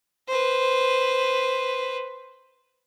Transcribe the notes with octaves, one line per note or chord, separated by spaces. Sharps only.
B4 C5